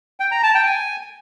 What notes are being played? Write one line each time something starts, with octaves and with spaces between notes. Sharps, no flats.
G5
A#5
A5
G5
G#5